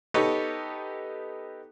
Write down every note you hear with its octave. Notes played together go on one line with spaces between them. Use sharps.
B3 D#4 G4 A4 B4 C#5